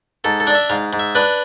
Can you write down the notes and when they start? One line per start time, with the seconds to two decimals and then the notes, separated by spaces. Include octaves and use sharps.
0.24 G#2 A4
0.40 A4
0.47 D4 D5
0.55 E5
0.70 G#2 F5
0.93 G#2
0.99 E5
1.15 D4 B4